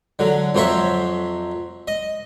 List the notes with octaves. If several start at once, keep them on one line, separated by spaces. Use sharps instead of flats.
D3 F#3
F2 F#3 C5 C#5 E5
D#5